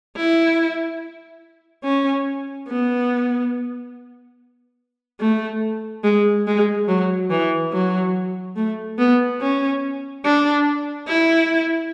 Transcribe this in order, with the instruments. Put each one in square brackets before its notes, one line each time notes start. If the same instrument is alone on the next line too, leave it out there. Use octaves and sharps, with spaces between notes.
[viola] E4
C#4
B3
A3
G#3
G#3
F#3
E3
F#3
A3
B3
C#4
D4
E4